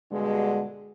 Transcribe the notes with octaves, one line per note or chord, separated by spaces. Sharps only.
G2 B2 D3 G#3